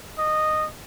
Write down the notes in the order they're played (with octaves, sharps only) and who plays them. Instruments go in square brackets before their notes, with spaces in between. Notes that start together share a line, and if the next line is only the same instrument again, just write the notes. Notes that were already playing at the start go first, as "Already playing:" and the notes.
[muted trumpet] D#5